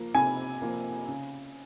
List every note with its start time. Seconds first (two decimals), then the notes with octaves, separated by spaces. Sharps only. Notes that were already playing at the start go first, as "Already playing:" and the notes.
Already playing: F3 A#3
0.15 C3 G#5
0.62 F3 A#3
1.08 C#3